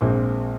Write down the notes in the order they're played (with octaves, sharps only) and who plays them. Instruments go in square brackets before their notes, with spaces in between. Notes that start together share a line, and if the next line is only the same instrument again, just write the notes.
[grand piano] A#1 A#2 G#3 C4